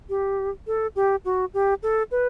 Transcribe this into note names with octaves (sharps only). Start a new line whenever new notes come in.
G4
A4
G4
F#4
G4
A4
B4